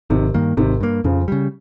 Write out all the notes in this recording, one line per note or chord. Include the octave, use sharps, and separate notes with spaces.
G#1 C3 D#3
G2 D#3 A#3
G#1 C3 D#3
G2 D#3 A#3
F2 C#3 F3
C#3 G3